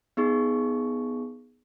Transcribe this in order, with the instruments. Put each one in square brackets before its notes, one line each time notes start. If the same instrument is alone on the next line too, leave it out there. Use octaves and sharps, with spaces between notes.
[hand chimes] B3 D#4 G#4 C#6